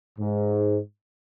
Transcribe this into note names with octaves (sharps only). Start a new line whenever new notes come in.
G#2